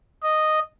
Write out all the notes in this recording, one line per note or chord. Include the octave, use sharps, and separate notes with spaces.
D#5